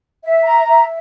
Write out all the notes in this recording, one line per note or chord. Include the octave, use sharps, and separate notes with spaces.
E5
A#5
E5